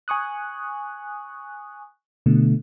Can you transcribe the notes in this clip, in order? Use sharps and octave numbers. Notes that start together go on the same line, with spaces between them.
G#5 C#6 D#6 F#6
B2 D3 A3